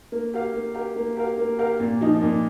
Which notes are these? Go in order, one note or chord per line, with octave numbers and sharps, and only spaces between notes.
A#3
G4 A#4 F5
A#3
G4 A#4 F5
A#3
G4 A#4 F5
A#3
G4 A#4 F5
A#2
F3 D#4
A#2